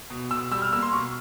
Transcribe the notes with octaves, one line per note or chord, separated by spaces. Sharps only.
B2
B2 E6
G3 E6
F6
A#3 E6
C6
B2 C#6